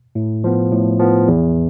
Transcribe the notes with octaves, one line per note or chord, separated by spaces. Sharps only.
A2
F3 B3
A2
F3 B3
E2